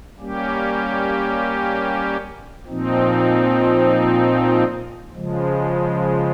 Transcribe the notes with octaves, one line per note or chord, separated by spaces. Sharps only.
G3 A#3 C#4 G4
A#2 F3 C4 D#4
C#3 F3 G#3